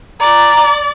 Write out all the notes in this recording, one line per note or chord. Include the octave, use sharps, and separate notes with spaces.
D5 A#5